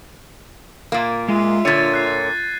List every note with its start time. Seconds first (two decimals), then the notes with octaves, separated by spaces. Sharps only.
0.92 A#2 A#3
1.28 G#3 F4 E5
1.65 A#2 D3 C#5 G#6 A6 D#7
1.94 F#6 C7